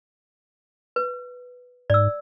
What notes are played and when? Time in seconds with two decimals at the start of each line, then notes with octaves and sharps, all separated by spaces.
0.96 B4
1.90 G#2 D5 E6